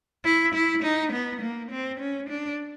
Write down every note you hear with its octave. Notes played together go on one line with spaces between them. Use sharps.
E4
E4
D#4
B3
A#3
C4
C#4
D4